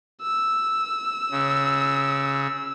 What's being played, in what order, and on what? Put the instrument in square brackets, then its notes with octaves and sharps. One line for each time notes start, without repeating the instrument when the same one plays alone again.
[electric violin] E6
[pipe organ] C#3